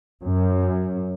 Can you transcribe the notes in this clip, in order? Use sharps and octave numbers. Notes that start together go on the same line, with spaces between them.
F#2